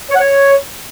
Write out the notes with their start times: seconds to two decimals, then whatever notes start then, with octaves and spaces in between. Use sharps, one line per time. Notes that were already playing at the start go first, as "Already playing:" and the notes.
0.10 C#5
0.15 F#5
0.21 C#5